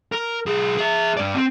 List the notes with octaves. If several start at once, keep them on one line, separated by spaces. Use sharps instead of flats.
A#4
B1 G#4
G#4 E5
G2 D5
C4